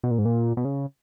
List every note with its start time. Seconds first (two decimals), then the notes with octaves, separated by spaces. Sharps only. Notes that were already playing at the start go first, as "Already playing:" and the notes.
0.03 B2
0.11 A#2
0.18 G#2
0.25 A#2
0.57 B2
0.65 C#3